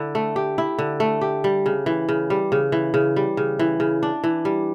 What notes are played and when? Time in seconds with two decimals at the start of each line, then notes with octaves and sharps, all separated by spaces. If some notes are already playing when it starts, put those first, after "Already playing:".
Already playing: D3 E4
0.15 A3
0.36 G4
0.58 E4
0.79 D3
1.00 A3
1.21 G4
1.44 G3
1.66 C#3
1.86 E3
2.09 C#3
2.30 G3
2.52 C#3
2.72 E3
2.94 C#3
3.16 G3
3.37 C#3
3.59 E3
3.80 C#3
4.03 D4
4.24 E3
4.45 G3